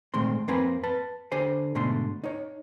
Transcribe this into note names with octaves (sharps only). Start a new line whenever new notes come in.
A#2 D#3 G#3 A3 C4 C6
F2 A#3 C4 B4 G#5 B5
B4 A5
D3 G4 C5 G#5
G#2 B2 D3 A3 C6
D#4 C#5